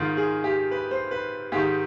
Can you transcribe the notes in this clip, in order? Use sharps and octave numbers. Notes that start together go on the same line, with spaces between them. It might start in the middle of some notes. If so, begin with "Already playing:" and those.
Already playing: G#2 D#3 F4
G#4
G4
B4
C5
B4
G#2 D#3 G4